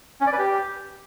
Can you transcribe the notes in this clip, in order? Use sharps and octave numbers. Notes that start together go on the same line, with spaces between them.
C#4
D5
B4
G4